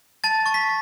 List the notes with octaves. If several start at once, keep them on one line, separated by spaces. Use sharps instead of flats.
A5 A6
C#6 A6
B6